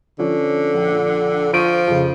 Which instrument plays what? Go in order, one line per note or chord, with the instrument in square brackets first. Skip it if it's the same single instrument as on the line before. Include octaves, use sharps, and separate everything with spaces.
[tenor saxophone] D3 [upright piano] F3 C#4
[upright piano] A#1
[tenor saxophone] F3 [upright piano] C#6 D7 D#7
[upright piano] F2 C#3